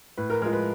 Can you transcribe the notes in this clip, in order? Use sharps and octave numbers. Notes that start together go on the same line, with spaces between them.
A2 B4
A#4
F3 G#3 A#4
B4